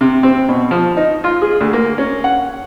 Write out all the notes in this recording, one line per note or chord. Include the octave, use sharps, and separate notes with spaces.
C3
C4
B2
F3
D#4
F4
G#4
D2
A#3
C#4
F#5